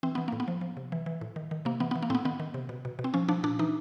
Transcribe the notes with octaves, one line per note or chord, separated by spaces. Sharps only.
E3 C4
E3 B3
A2 A#3
B3
F3
F3
C3
E3
E3
A2
D#3
D#3
C3 A#3
E3 B3
E3 B3
A#3
A2 B3 C4
D#3 B3
D#3
C3
B2
B2
B2
C4
F3 C#4
F3 D4
A#2 D4
E3 D#4